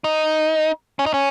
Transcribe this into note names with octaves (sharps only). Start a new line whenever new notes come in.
D#4
C#4
D#4
C#4